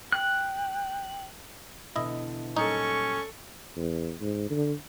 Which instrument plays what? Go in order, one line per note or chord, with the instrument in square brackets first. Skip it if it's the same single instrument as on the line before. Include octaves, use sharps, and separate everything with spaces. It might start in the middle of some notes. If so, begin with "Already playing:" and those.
[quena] G5 [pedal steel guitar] F#6
[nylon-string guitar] B2 D3 E3 [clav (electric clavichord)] E4 D#5
[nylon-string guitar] A#2 F#3 G3 [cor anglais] C#4 [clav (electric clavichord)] D#4 [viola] A4 C#6
[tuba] E2
G#2
D3